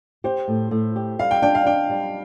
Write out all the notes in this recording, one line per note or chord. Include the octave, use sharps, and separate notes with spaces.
G4 C5
A2
A2
G4
G3 F5
G5
D4 G5
F5
D4 G5
G3